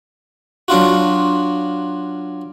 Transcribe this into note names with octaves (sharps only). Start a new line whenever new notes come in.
F#3 D4 F4 F#4